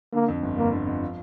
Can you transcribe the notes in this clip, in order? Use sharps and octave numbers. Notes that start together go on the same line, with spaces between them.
D3 A#3
F2
G1
G1 A#3
D3
F2
F3